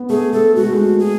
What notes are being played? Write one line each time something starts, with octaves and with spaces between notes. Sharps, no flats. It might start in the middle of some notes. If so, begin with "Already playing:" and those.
Already playing: B3
A3 G#4
A3 A4
G#3 F#4
A3
G#3
G#4